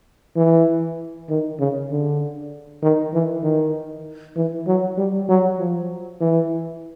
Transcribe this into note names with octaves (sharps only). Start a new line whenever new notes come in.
E3
D#3
C#3
D3
D#3
E3
D#3
E3
F#3
G3
F#3
F3
E3